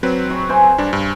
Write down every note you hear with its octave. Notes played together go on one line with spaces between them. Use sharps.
F#3 C4 B4
C#6
C5 G#5
G2 D4
G2